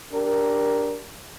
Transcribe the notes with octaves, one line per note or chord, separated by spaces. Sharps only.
D4 G4 A#4